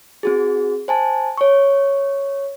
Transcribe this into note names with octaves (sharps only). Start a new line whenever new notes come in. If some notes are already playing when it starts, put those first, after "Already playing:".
C4 F#4 G#4
C5 G#5 A5
C#5 C#6